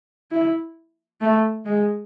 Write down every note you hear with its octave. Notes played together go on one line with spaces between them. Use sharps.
E4
A3
G#3